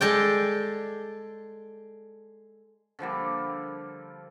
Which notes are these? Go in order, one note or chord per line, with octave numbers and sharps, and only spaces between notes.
G#3 A4 D5 G5
D3 F3 G3 A#3